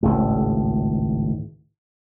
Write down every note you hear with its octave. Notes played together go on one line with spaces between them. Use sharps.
G#1 C#2 A2